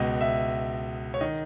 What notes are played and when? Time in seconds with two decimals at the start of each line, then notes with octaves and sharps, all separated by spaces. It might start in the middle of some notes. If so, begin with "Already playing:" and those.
Already playing: C#2 B2 D#5
0.21 E5
1.14 C#5
1.21 D#3 D#5